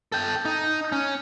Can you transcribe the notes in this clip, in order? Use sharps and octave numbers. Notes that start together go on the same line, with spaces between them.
A4 G5
D#4
C#4